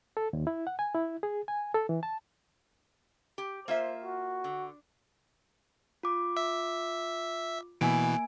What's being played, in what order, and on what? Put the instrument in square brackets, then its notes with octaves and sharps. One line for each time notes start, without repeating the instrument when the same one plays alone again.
[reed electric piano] A4
D#2
E4
F#5
G#5
E4
G#4
G#5
A4
E3
A5
[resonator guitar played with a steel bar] G4
[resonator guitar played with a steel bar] A#3 F4 E5 [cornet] C5
[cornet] F#4
[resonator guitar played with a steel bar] D3
[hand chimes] F4 D6
[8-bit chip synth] E5
[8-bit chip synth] B2 E3 [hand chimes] A#3 G#5 D7